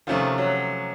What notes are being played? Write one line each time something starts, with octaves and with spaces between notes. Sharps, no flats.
C3 D#3 F3 A3 C#4 F4
F#3